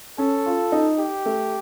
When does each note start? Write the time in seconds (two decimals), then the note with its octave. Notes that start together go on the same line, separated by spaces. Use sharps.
0.18 C#4 A4
0.46 F4
0.72 D#4
0.99 G4
1.26 A3